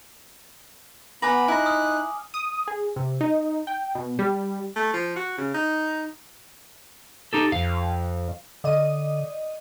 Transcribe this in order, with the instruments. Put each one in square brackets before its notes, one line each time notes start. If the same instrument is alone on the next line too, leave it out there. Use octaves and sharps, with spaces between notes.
[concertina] B3 B5 [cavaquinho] F#5 A#5 [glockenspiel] G#5 D6 F#7
[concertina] D#4 F#6 [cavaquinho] E4 A#5
[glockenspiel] D#6 F6
[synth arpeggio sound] D#6
G#4
C3
D#4
G5
B2
G3
[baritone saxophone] A3
F3
F#4
C#3
D#4
[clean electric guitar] D#4 G4 A4
[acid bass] F2 [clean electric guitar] F5
[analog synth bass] D3 [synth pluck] D5 D#5 D#7